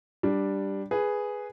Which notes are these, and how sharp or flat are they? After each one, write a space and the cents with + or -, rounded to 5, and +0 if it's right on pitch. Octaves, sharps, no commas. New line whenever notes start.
G3 +0 D4 +0
G#4 +0 B4 +0